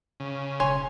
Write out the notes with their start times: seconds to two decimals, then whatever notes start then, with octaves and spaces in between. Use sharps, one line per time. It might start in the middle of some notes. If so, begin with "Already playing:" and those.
0.20 C#3
0.60 E1 C#5 G#5 C6